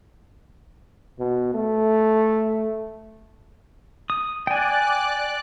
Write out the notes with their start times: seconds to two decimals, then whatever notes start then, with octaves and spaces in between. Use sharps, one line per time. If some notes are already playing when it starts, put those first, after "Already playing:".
1.19 B2
1.54 A3
4.10 D#6
4.47 D5 G5 G#5 F#6